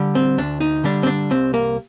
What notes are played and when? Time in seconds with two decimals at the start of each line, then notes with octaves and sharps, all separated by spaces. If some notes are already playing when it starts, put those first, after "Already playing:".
Already playing: D3 G3
0.15 C4
0.38 D2 D4
0.60 D#4
0.84 D3 G3 D4
1.03 C4
1.07 D4
1.31 C2 C4
1.54 A#3